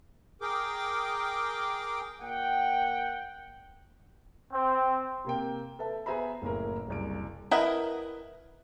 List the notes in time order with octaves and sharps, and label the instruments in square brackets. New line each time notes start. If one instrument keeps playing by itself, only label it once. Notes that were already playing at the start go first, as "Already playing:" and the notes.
[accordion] G#4 A#4 G5 D6
[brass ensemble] A#2 A#3 F#5 G5
[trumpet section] C4
[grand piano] C3 A#3 G5
A4 B4 E5 A5
B3 G#4 C5 E5 A#5 B5
F#1 A2 A#3 E4 A#4
F#1 C2 D7
[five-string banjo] E4 A#4 B4 D#5 F#5